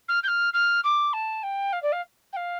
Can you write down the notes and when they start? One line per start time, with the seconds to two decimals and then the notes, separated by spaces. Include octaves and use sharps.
0.08 F6
0.23 G6
0.28 F6
0.53 F6
0.84 D6
1.13 A5
1.43 G5
1.73 F5
1.82 D5
1.92 F5
2.33 G5
2.36 F5